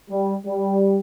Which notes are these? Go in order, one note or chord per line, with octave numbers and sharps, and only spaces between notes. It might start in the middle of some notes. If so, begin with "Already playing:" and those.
G3
G3